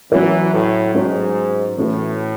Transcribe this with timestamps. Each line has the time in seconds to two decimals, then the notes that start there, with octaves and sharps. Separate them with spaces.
0.12 E3 F#3 C#4 F#4 C#5
0.53 A2
0.94 G#2 F#3 C#4 F#4 C#5
1.77 A2 E3 A3 C#4 F#4 B4